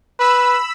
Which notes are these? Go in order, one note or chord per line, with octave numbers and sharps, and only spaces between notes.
B4 B5 E6